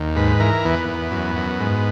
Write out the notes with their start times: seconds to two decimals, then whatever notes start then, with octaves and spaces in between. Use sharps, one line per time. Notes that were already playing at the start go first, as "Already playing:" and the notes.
Already playing: D#2
0.16 G#2 B4
0.40 E3 A#4
0.65 E2 B3
0.89 E2
1.12 F#2
1.36 F#2
1.60 G#2